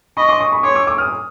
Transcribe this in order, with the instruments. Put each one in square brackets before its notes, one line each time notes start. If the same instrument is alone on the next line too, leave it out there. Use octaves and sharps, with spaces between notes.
[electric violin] D#5 [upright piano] B5 C#6
[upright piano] C6 D6
C#6 D#6
B5 C#6
[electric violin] C#5 [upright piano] C6 D6
[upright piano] D6 E6
D6 E6
D#6 F6